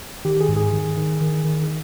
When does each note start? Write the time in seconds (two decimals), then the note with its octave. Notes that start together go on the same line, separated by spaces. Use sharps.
0.25 D#3 G4
0.41 G#4
0.49 G#2
0.56 G#4
0.73 D#3
0.97 D#3
1.21 D#3
1.44 D#3